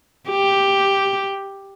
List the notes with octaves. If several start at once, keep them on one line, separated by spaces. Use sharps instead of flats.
G4